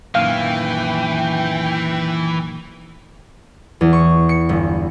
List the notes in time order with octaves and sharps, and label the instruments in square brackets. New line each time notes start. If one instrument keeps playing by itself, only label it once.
[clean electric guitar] F#2 A#2 D#3 [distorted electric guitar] E3 [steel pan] F5 [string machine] G5
[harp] E2
C#6
C#7
G1